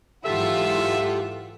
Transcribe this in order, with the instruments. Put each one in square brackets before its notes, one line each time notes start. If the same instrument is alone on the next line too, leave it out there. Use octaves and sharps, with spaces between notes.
[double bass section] G#2 E3 F#3 [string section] F4 F#5 [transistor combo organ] G4 A4 [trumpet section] E5